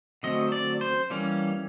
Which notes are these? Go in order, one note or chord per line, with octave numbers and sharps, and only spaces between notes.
D3 F#3 A3 C4 D#5
D5
C5
E3 G3 A#3 C#4